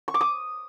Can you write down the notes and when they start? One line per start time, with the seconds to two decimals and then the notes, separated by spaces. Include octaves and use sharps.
0.08 C#6
0.14 D6
0.21 D#6